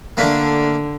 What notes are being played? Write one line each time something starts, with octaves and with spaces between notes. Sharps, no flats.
D3 A3 A#3 D4